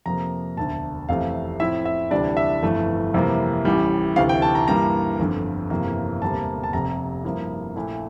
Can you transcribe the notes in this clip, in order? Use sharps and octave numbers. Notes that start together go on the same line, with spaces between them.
F2 C3 F3 A#3 A#5
E1 D2 D3 A5
F1 E2 C3 F3 A3 F5
A2 F3 C4 E4 E5
E5
D2 C3 E3 G3 D4 D5
E5
G1 F2 E3 A3
F2 C3 E3 G3 A#3
A1 A2 E3 G3
D2 C3 E3 F5
G5
A5
A#5
G2 E3 G3 A#3 A#5
G1 F2 D3
G1 F2 C3 E3 A#3
E1 D2 C3 G3 A#3 A5
A5
F1 F2 C3 A#5
G2 F3 A#3 E4
A#1 A#2 A3 E4